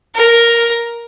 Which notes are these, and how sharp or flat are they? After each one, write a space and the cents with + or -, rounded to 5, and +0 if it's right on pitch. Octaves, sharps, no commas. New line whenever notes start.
A#4 +5